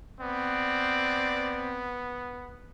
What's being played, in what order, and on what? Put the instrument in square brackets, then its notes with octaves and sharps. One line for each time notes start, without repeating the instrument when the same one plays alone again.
[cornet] B3 [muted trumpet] C4 [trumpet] D5